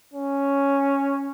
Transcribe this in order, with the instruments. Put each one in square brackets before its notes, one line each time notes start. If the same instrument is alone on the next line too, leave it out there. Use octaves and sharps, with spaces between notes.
[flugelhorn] C#4